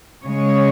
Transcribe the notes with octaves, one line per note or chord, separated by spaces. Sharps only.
C#3 G#3 C#5